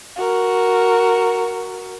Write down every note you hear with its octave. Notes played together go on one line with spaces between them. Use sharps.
F#4 A#4